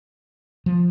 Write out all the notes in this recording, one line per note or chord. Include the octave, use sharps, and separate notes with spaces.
F3